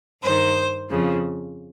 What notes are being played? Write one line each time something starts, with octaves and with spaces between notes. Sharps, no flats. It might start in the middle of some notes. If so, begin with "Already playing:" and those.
G2 D#3 C5
F2 C#3 F3